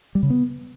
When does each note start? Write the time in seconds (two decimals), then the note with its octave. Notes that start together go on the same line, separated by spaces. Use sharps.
0.15 G3
0.23 C#3
0.30 B3